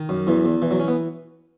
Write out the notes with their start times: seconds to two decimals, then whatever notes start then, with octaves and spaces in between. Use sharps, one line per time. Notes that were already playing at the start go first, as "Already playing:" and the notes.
Already playing: D#3
0.09 F#2
0.27 E2 E3
0.45 E2
0.62 E3
0.71 F#3
0.80 C#4
0.88 B3